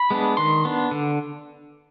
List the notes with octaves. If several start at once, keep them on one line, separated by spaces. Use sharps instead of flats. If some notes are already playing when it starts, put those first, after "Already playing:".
Already playing: B5
G#3 B3 D4
D#3 C6
B3 D4
D3